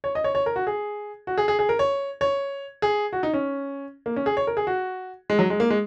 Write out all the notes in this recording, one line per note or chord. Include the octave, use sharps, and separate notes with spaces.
C#5
D#5
C#5
C#5
A#4
F#4
G#4
F#4
G#4
G#4
G#4
A#4
C#5
C#5
G#4
F#4
D#4
C#4
A#3
C#4
G#4
C#5
A#4
G#4
F#4
G#3
F#3
G#3
A#3
G#3